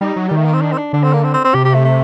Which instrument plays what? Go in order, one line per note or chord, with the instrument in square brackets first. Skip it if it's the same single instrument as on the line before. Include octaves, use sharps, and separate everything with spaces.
[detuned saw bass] G3 [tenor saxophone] D#4
[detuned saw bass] F#3
[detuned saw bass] D#3 [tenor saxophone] G3
[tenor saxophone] A3
A#3
C4
D4
C4
D4
[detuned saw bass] D3 [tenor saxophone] D4
[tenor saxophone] C4
A#3
C4
C4
C4
[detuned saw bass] C3 [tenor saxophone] G4
[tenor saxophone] G4
A3
A3